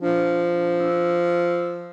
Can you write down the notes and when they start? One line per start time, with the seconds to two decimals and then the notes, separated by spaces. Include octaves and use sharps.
0.01 F3 D4
0.80 E6